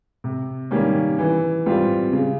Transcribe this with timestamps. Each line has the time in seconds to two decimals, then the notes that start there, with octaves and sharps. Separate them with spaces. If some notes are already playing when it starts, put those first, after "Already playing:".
0.24 C3
0.71 D#3 G3 A#3 C#4
1.19 E3
1.66 G3 C4 F4
2.13 C#3